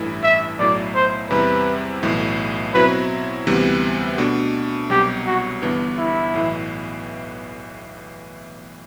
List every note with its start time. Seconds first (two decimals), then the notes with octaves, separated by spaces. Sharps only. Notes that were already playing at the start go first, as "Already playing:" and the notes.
Already playing: A1 G2 E3 A3 E4
0.23 E5
0.59 B1 A2 F#3 A3 E4 D5
0.95 C5
1.30 E2 C3 G3 C4 E4 B4
2.03 B1 A2 E3 A3
2.74 B2 F#3 C4 E4 B4
3.47 D2 C3 E3 G3 B3
4.18 B2 A3 D4
4.90 C2 B2 F#3 G4
5.27 F#4
5.62 G1 G2 E3 B3
5.98 E4
6.34 B1 A2 E3